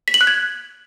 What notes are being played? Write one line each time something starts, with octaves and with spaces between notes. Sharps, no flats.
B6
F#7
F#6
G#6